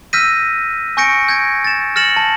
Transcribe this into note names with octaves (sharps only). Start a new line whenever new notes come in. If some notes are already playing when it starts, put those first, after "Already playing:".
E6 F6 G6 A#6 B6 D#7
G#5 C#6 G6 A#6 C#7 D7
G6 G#6 A#6 D7
A6 E7
F6 A6 A#6 C#7 E7 F#7
A5